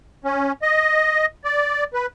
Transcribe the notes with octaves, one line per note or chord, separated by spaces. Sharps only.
C#4
D#5
D5
B4